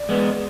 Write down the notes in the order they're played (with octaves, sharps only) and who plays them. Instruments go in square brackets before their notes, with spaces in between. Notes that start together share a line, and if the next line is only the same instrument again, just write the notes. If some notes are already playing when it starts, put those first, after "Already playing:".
Already playing: [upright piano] D5
[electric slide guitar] G#3 B3